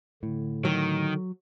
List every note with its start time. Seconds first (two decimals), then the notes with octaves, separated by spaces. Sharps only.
0.23 A2 D3
0.65 D#3 F#3